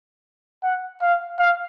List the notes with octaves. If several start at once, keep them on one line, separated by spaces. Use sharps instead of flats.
F#5
F5
F5